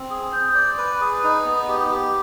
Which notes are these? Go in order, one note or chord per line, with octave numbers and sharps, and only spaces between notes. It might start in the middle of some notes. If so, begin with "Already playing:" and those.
Already playing: C4
G#4
C5
D5
B4
G#4
D#4
B3
G4
G4